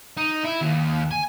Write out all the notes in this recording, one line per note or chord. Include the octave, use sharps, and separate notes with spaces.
D#4
E4
D#2
G#5